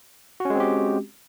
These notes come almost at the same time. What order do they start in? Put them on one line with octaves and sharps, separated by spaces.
F#4 C#4 G#3 C4 G4